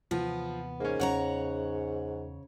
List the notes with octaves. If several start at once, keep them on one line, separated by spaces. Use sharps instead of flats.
D#2 C3 E3 F3 B3
G#2 A#3 C#4
E2 C#3 C#5 F#5 A#5